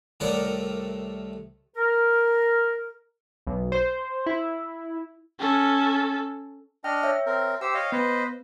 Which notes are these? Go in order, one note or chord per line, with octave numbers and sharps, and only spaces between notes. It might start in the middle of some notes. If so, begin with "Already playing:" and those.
C2 A2 D#3 A#4 D5 F#5
A#4
B1
C5
E4
C#4 A4
D4 D#5 G5 F6
C#5 E5
C4 A#4
G4 C5 G5 E6
C#5 D#5 F5
B3 B4 C5 D#5